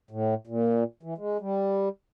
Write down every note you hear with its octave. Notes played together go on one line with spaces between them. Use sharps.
A2
A#2
E3
G#3
G3